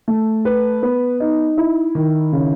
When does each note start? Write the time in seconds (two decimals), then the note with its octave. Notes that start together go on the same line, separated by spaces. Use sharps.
0.08 A3
0.45 B4
0.83 B3
1.20 D#4
1.58 E4
1.95 D#3
2.33 C#3